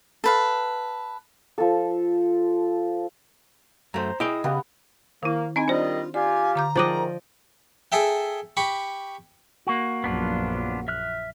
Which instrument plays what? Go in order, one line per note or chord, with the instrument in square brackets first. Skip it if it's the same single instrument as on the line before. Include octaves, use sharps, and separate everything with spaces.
[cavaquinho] A4 B4 F5
[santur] F3 A4
[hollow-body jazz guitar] F#2 A3 [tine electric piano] C5 A#5
[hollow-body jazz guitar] E4 G5 [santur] G#4 D#6 [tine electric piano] D#5
[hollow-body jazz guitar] C#3 [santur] B3 G4 F#5
[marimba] D#3 E4 [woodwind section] A#3
[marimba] C4 D#4 B5 [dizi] D#5 [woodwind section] G#5
[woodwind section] D#3 G3 D#5 [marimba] D4 C5 [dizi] F4
[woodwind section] F4 G4 [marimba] D5 [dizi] G#5
[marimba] D3 D6 G6 [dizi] A#5
[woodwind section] G#2 D#3 [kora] F3 D5 D#5 [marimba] D6 F#6 A6
[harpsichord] G#4 A4 E5 G5
G4 B5 C#6
[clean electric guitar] A#3 F#4
[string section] A#1 F#2 F3 [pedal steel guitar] B3 D4 F4
[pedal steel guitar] E5 F6 F#6